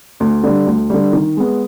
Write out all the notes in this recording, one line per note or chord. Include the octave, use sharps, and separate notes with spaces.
D2
D3 G3
D2
D3 G3
D#3
G#3 B3